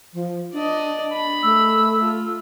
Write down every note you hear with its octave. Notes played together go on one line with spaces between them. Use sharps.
F3
D4 D5 D#5
B5
A3 E6
F4